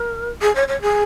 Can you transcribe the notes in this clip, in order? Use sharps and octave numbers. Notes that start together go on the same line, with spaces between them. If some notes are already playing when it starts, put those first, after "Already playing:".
Already playing: A#4
G#4
C#5
C#5
G#4